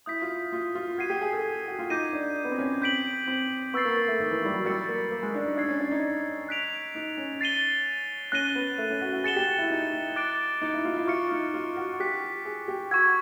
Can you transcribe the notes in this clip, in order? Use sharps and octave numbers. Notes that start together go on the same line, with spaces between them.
E4 D#6 G6 B6
F4
F4
F4
F#4 G#6 C7 D#7
G4
G#4
A4
F#4
F4
D#4 D6 G6 A#6 D#7
D4
B3
C4
C#4
C4 G6 B6 D7 F#7
C4
B3 C#6 E6 A6 C7
A#3
A#3
A3
D#3
E3
G3
F#3
G3 E6 A6 C#7
A#3
A#3
G#3
D4
D#4
D4 E6 G#6 C7
C#4
D4
D#4
F#6 B6 D7 F7
D#4
C#4
A6 C7 D#7 G7
C#4 F#6 A#6 D#7 G7
B3
A3
C#4
F#4
F#4
G#4 A6 C#7 E7 G7
G4
F#4
E4
D#4
D6 F#6 A6 D7
D#4
E4
F4
E4
F4 C#6 F6 A6 C#7
D#4
F4
F#4
G4 D6 F#6 B6
G#4
G4
F#4 C#6 E6 G#6